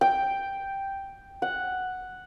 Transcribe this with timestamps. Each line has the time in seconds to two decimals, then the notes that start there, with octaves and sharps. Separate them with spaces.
0.01 G5
1.42 F#5